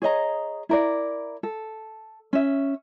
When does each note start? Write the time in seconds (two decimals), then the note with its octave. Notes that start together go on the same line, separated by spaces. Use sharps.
0.02 G#4 C#5 D#5 A#5
0.69 E4 A#4 D5
1.43 A4
2.33 C#4 E5